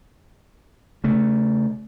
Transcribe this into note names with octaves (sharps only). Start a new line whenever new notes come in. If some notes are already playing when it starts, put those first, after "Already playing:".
C#3 A3